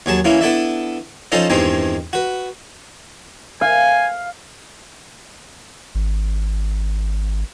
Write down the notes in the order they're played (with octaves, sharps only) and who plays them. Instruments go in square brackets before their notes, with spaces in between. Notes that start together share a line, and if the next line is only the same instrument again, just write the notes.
[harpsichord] D#2 F#3 G#4 A5
E3 A#3 C#4 E4
B3 D4 E4 A4 D5 E5
F3 C#4 D#4 A4 C5 D#5
E2 G2 D#3 G#3 C4 D#4
F#4 B4
[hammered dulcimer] F5 [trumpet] G#5
[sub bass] G#1